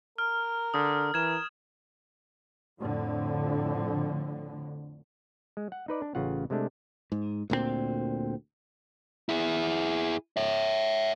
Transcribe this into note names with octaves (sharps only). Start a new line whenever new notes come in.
A#4 F6
D3 D#6
E3 A#4 G#6 E7
F2 A2 D3
G#3
F#5
D#4 B4 D5
D4
A1 C#3 F4 F#5
C3 G#3 A3 D4
G#2
D2 A#2 F#3 C4
E4 G#4
C#5 E5